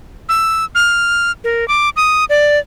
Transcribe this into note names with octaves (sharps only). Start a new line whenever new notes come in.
E6
F6
A#4
D6
D#6
D5